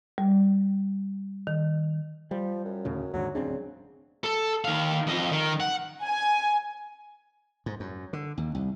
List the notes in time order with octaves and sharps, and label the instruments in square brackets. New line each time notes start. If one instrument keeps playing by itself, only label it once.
[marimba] G3
D#3
[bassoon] F3 [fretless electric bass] G3
[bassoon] F#2
[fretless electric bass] D2 A2 C#3
[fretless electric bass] D#2 G#2 D3 [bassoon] F#3
[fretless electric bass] D1 C4 D4 [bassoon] C#3
[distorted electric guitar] A4
D#3 F5
F2 D#5
D#3
F#5
[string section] G#5
[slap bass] G#2
F#2
D3
D#2
C2